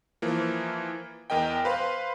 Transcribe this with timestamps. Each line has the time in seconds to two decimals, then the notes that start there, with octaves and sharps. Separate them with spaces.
0.22 E3 F3 A#3
1.30 E2 A#4 D#5 G5
1.65 B4 C5 F5 B5 C6